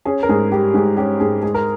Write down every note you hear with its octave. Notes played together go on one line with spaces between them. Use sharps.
C#4 G#4
A#4
G#2 G#4
G3 G4
G#2 G#4
C#4 G4
G#2 G#4
G#3 G#4
A#4